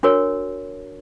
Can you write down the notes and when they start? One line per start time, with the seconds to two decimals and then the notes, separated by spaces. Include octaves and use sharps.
0.03 D4 F#4 A#4 C#5